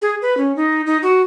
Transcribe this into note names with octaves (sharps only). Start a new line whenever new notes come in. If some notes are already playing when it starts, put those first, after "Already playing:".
G#4
B4
C#4
D#4
D#4
F#4